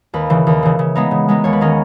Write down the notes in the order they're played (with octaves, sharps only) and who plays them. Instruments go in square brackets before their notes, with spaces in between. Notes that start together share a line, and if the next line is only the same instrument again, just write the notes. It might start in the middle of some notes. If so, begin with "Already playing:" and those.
[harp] D#2 B4
C#3 E3
D#2
C#3 E3
C#3
G#3 B3 D#4
C#3
G#3 B3 D#4
D#2 C#5
B4
D#3 G#3 C#4 A#4